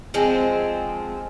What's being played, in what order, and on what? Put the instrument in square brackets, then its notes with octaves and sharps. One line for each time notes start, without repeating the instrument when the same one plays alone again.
[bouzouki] F3 G#3 C4